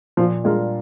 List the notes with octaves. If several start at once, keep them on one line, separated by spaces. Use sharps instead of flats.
A#2 F3
G3 G#3 D4 F4 A#4